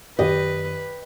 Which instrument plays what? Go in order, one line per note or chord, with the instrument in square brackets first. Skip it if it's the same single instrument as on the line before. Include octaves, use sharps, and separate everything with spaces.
[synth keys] F#2 D#3 [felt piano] G4 [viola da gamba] B4 [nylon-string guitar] D#5